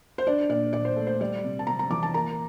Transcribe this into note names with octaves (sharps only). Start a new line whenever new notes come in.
C5
D4 D5
A#2 D5
A#2 D5
C5
A3
C5
G3 D5
C3
A5
C3 A#5
A#5
E3 D6
A5
A#3 A#5